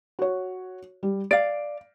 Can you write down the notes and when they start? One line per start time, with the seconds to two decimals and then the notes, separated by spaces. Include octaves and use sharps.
0.19 F#4 C#5
1.03 G3
1.31 D5 F5 D7